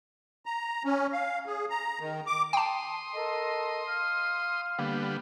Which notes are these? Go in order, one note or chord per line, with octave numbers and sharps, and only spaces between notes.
A#5
C#4
F5
G#4
A#5
D#3
D6
G5 A5 C6 D#6
A4 A#4 D#5
F5 F6
D3 G3 A#3 B3